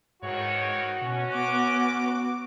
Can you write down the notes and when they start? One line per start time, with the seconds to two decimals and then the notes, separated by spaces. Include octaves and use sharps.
0.22 G#2 D#3 E3 F#4 C#5
1.01 B2 C#4
1.35 B3 D6